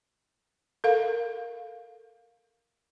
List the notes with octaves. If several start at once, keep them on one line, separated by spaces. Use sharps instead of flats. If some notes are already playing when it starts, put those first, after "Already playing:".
A4 A#4 F5